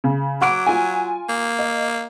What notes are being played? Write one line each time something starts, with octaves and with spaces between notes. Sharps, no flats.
C#3
F#3 F#5 D6 D7
F4 G#5
A#3
D#5